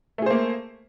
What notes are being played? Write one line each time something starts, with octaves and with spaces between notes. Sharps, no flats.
A3 A#3 G#4 C5